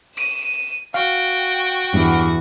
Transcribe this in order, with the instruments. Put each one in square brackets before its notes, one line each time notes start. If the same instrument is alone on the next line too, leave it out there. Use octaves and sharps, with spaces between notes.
[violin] D#7 E7
[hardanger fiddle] F#4 [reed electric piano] F5 [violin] G5
[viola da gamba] E2 [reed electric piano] G2